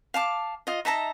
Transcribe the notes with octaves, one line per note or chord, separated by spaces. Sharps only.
F5 A5 D6
F4 D#5
D#4 E5 A5 A#5